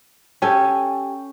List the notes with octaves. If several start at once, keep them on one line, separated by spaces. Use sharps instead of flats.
C#4 G4 A4 G#5